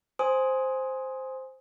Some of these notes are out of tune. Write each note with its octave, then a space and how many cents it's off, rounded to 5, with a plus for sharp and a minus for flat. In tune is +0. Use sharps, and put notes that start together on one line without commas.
C5 +0 G#5 +0 D#6 +15